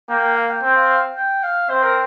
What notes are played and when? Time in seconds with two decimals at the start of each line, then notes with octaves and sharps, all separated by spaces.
0.09 A#3 G5
0.23 G5
0.36 F5
0.50 G5
0.63 C4 G5
0.76 F5
0.89 F5
1.16 G5
1.43 F5
1.70 C4 C5
1.83 A#4